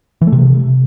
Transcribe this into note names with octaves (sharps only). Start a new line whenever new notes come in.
E3
A3
C3